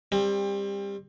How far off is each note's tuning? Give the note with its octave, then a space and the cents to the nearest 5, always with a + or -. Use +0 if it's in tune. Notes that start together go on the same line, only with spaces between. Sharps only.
G3 +25 C4 +30